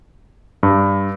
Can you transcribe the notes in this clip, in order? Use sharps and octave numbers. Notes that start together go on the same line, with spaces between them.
G2